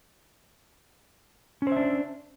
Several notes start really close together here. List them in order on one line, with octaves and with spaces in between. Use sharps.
C#4 C5 E5 D4